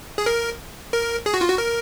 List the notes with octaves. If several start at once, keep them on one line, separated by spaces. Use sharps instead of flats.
G#4
A#4
A#4
G#4
F#4
F4
F#4
A#4